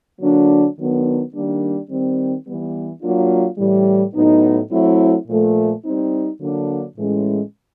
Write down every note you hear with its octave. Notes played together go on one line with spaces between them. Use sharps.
D3 F#3 A#3 D4
D#3 F#3 B3 D4
D#3 G3 A#3 D4
D#3 G3 C4
E3 G3 B3
F#3 A#3 D4 F4
A2 E3 G3
A2 F#3 B3 D#4
F#3 A3 C4 E4
A#2 F3 A3
G3 C4 D#4
D3 F#3 A#3 D4
A2 E3 G#3 C#4